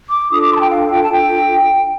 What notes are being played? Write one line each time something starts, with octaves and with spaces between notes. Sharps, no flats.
D6
D4 F4 A4 D#6
D6
C6
A5
G5
F5
G5
A5
G5